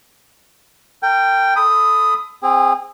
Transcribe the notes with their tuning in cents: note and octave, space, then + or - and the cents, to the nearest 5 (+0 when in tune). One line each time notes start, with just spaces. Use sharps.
A#4 -35 G5 +0
A4 +0 B5 +25 D#6 +0
C4 +0 G#4 -25